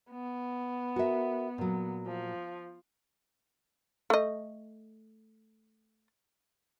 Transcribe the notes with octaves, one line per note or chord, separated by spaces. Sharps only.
B3
F#4 A#4 E5
A#2 F#3
F3
A3 D#5